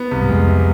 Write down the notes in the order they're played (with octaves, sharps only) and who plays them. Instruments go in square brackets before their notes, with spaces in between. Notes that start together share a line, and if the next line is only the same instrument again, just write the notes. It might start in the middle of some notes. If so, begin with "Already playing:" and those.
Already playing: [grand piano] B3
C2
[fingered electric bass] G#2
[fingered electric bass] F2 [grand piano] G#3
[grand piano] C3